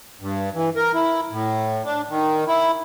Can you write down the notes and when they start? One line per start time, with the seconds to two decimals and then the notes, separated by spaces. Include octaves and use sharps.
0.21 G2
0.54 E3
0.76 A#4
0.94 E4
1.31 A2
1.85 D4
2.10 D#3
2.48 E4